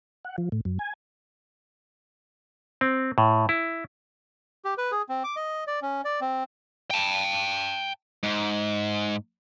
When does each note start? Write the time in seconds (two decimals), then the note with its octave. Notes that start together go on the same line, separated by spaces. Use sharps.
0.25 F#5
0.38 F3
0.52 A2
0.65 F#2
0.79 G#5
2.81 C4
3.18 A2
3.49 E4
4.65 G4
4.78 B4
4.92 G#4
5.09 C4
5.24 D6
5.36 D#5
5.67 D5
5.82 C#4
6.05 D5
6.21 C4
6.91 G5 A5
8.23 G#2